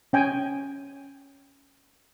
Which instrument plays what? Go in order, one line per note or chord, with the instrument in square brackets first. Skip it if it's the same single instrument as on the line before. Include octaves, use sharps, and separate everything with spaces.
[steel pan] C#4 G5 G#5